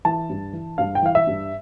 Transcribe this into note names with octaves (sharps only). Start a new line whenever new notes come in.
E3 A5
G2
E3
G2 F5
G5
E3 F5
E5
G2